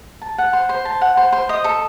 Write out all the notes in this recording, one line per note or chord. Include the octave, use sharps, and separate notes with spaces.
A5
F#5
C5
C5
A5
F#5
C5
C5
D#5
A4